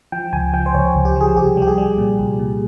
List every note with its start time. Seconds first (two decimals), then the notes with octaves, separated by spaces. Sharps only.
0.12 F3 G5
0.33 C#2 G#5
0.53 F3 G5
0.66 C5
0.74 C#2 C#5
0.95 C#2
1.05 G4
1.16 F3 G#4
1.36 C2 G4
1.57 G3 G4
1.68 G#4
1.78 G3
1.98 A#2
2.19 C2
2.39 A#2